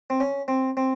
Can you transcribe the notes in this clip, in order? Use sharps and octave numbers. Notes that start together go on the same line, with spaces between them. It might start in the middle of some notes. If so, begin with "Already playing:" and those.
C4
C#4
C4
C4